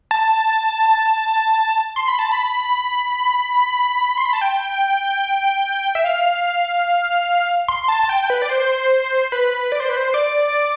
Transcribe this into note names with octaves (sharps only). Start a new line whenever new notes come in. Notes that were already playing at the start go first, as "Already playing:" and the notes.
A5
C6
B5
A5
B5
C6
B5
A5
G5
E5
F5
C6
A5
A5
G5
B4
D5
C5
B4
D5
C5
B4
C5
D5